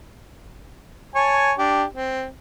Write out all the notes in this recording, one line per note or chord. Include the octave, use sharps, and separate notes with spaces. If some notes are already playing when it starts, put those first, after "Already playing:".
C#5 G#5 A5
D4 G4
C4